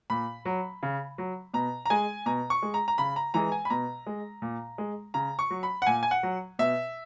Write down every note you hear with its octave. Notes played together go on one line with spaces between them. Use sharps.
A#2 B5
F#3
C#3
F#3
B2 A#5
A#5
G#3 G#5
B2 A#5
C#6
G#3
A#5
A#5
C#3 B5
A#5
E3 G#3 A#5
G#5
B5
B2 A#5
G#3
A#2
G#3
C#3 A#5
C#6
F#3
B5
F#5
A#2 G#5
G#5
F#5
F#3
B2 E5